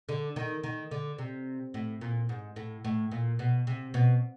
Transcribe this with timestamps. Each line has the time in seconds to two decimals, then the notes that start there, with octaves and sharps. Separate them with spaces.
0.09 D3
0.36 D#3
0.64 D#3
0.91 D3
1.18 C3
1.74 A2
2.01 A#2
2.29 G#2
2.56 A2
2.84 A2
3.11 A#2
3.39 B2
3.67 C3
3.94 B2